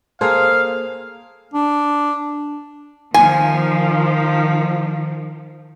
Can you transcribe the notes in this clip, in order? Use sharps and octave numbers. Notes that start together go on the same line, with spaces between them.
A#3 G#4 A4 C5 F5
D4
D#3 F3 G#5